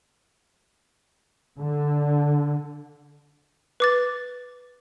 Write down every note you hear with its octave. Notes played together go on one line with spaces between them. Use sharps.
D3
B4 D6 A6